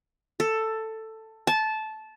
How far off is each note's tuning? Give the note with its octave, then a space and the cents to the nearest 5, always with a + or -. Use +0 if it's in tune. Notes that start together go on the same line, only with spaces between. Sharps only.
A4 +10
A5 -15